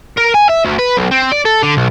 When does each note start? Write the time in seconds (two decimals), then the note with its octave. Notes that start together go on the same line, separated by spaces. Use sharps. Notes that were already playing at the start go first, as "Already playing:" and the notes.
0.17 A#4
0.34 G#5
0.49 E5
0.64 D2
0.78 B4
0.97 B1
1.11 C4
1.32 D5
1.45 A4
1.63 D3
1.77 B1